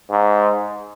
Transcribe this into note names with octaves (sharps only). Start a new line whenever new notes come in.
G#2